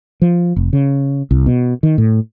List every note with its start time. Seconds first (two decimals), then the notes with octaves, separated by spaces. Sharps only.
0.22 F3
0.56 F1
0.73 C#3
1.31 C2
1.46 B2
1.83 D#3
1.98 A2